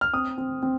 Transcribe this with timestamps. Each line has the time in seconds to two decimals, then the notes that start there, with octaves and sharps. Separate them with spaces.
0.01 F6
0.13 C4 D#6
0.38 C4
0.63 C4